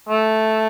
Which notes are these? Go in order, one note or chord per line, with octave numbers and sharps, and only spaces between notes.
A3